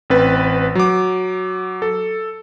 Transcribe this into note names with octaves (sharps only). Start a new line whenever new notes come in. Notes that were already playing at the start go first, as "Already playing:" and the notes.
A1 C4 B4 A6
F#3 D6
A4